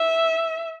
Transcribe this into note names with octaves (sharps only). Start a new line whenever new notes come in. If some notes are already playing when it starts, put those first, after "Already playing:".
Already playing: E5